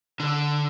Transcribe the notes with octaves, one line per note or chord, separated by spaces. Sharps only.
D3